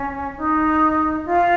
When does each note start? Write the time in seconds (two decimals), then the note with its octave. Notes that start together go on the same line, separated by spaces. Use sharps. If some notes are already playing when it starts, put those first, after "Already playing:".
Already playing: C#4
0.37 D#4
1.25 F4